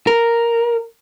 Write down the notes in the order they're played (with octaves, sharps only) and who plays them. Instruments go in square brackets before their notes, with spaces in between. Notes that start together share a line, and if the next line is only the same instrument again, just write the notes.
[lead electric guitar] A#4